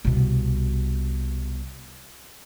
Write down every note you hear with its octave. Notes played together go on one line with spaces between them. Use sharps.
C2 B2